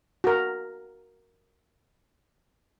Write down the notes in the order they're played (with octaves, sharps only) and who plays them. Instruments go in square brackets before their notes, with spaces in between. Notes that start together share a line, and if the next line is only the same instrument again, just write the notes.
[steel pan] F#4 A#4